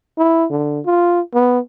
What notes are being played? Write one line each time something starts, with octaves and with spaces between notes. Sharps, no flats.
E4
D3
F4
B3